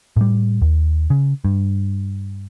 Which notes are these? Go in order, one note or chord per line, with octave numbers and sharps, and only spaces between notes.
A2 G3
D#2
C#3
G2